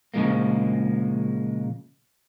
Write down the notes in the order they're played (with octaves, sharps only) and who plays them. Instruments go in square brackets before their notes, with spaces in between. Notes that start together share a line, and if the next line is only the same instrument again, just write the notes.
[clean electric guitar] A#2 C#3 E3 F3 G#3 A#3